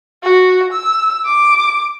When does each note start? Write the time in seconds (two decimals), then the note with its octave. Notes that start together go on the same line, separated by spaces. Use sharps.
0.23 F#4
0.73 E6
1.25 D6